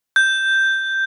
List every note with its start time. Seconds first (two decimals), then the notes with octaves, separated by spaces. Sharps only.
0.16 G6